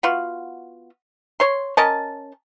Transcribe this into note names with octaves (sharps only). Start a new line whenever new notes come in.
B3 F4 F#4
C#5 C6
C#4 A#4 D#5 A5